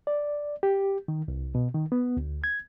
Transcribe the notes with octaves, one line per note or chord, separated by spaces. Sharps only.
D5
G4
D#3
C2
B2
D#3
B3
D2
G#6